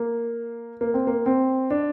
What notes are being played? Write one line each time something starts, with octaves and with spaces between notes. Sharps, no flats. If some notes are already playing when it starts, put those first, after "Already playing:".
Already playing: A#3
A#3
C4
A#3
C4
D4